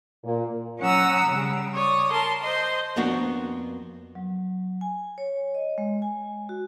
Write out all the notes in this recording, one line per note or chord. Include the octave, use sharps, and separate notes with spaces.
A#2
F#3 C#4 F#5 A#5 D#6 E6
C#3 G3
C#5 D5 D#6
A#4 A5 C6
C5 D#5 C6
F2 A#3 B3 D4 F#4
F#3
G#5
C#5
D#5
G#3
G#5
F#4